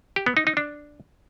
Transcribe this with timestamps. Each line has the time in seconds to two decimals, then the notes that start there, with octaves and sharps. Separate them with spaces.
0.16 G4
0.26 B3
0.37 D#4
0.47 D#4
0.57 D4